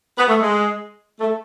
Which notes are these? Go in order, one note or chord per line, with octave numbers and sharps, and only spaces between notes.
B3
A3
G#3
A3